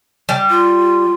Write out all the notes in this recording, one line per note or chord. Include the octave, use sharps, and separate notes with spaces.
G3
F4